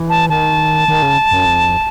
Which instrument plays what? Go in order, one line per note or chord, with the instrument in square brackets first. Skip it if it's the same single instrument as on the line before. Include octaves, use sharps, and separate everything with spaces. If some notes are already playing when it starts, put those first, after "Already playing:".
Already playing: [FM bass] E3
[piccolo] A5
[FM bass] D#3 [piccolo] A5
[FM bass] D#3
C#3
F#2
F2